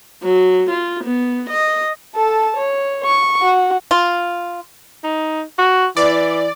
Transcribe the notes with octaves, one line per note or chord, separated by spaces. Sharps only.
F#3
F4
B3
D#5
A4 A5
C#5
C#6
F#4
F4
D#4
F#4
E3 D5